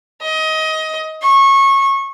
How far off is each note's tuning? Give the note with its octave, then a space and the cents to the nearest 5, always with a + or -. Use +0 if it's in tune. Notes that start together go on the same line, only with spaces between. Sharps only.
D#5 +20
C#6 -20